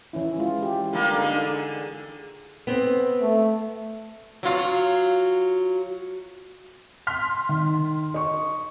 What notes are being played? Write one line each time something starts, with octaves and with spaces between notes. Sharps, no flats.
E3 C#4 E4
G#3 F4
G4
D3 G3 A#3
D3 D#4 G#4
B3 C4
A3
F#3 F4
C6 F6 B6
D#3
D#5 C#6